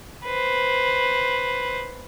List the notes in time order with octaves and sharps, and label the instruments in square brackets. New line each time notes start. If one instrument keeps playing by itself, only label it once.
[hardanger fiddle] B4 C5